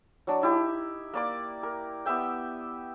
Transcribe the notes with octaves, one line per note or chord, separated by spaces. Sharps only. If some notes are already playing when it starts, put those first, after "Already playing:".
F#3 D4
D#4 E4 G4
A#3 D5 D6
A#4
B3 G4 E5 G5